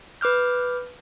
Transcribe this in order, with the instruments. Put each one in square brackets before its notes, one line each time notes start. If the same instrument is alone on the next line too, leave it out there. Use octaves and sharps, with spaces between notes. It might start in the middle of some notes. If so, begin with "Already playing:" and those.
[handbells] B4 D6 F6 G6